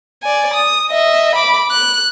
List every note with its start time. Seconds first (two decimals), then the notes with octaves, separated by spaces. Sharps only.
0.23 D5 G#5
0.54 D#6
0.90 D#5 E5
1.35 B5 D6
1.71 F#6